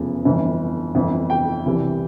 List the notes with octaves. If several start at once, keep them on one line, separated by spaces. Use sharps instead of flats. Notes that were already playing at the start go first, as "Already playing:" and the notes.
Already playing: F1 E2 C#3 F3
G1 F2 E3
G1 F2 E3
G5
C2 C3 E3 G3